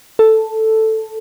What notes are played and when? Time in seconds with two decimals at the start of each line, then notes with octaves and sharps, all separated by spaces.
0.19 A4